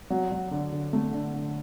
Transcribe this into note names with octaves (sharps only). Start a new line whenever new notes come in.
F#3
F#3
D3
D3
A3
D3
D3